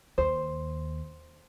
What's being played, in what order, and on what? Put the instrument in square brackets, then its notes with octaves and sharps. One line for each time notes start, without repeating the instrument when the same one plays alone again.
[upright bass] D#2 [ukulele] C5